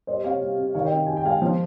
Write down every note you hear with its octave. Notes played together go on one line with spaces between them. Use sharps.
G3 C5 D#5
C3 C#5 F5
G3
C3
D#3 C#5 F5
D#5 G5
C3
C3 G#5
G5
G#3 F5 G#5
F3